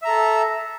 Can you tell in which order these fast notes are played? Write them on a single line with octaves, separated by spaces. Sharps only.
E5 A#5 A4